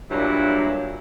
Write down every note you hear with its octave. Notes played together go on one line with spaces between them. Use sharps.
G2 A#2 F#3 E4